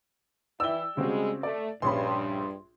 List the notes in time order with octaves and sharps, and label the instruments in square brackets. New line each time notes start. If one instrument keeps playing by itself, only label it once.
[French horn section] E3 E4 [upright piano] D5 G5 G7 [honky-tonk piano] E6
[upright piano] C#3 C4 F#4 [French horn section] G3 G#3
[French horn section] A3 [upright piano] D5
[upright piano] A#1 C#4 B5 [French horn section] G2 [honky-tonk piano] C6